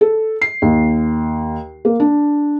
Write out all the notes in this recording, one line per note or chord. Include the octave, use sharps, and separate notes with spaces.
A4
C7
D#2
A#3
D4